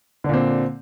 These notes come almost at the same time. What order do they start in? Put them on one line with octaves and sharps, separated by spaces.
D3 A#2 C4